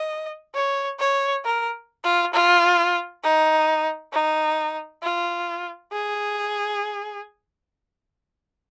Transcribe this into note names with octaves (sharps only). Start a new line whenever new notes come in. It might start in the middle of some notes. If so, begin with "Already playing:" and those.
Already playing: D#5
C#5
C#5
A#4
F4
F4
D#4
D#4
F4
G#4